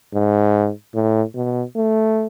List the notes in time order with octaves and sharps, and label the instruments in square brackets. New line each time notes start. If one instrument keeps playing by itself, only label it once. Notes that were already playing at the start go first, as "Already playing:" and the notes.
[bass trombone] G#2
A2
B2
A3